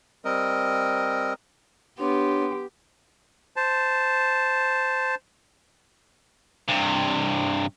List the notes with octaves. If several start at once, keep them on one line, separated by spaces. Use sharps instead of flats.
G3 C4 A#4 D#5
B3 D4 G4 C#5 C6
C5 A5
G2 C3